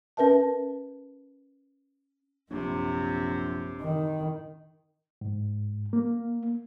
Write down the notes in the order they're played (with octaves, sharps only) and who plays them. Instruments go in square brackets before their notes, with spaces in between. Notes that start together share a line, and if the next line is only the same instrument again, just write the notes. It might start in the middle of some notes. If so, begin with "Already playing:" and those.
[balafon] C#4 A#4 B4 E5 A5
[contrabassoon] A#1 [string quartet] F#2 C3
[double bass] D#3
[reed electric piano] G#2
A#3